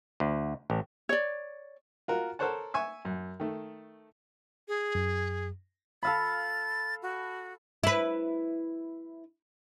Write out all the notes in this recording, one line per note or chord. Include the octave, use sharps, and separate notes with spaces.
D2
A1
C#5 D5
F4 F#4 A#4
A4 A#4 C5 C#5 F#5 A5
E5 G#5 C#6
F#2
D#3 A3
G#4
F#2
A4 F5 B5 A6
F#4
E4 B4